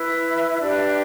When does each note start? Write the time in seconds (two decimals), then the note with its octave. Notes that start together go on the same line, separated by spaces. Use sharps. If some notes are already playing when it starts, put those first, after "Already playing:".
Already playing: E4 B4 E5
0.60 D4 G4 B4